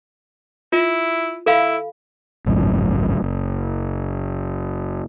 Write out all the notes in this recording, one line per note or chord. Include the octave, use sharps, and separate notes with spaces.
E4 F4
E4 A4 F5 B5
G#1 C#2 F#2 A2
F#1